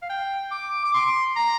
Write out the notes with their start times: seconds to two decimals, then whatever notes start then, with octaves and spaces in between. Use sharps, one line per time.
0.02 F5
0.09 G5
0.51 D6
0.85 D6
0.94 C6
1.36 A#5